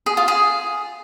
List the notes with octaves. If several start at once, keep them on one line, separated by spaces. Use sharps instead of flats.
G#4
F4
G#4